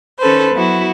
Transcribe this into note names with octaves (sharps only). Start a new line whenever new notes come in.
D#3 C#4 A4 B4 C5
F#3 B3 E4 F#4